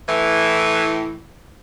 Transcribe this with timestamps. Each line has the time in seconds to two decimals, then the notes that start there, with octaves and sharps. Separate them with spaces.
0.08 A2 E3